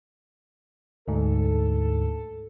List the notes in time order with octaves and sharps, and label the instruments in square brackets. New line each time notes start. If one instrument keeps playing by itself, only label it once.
[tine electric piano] D2 G#2 [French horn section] A4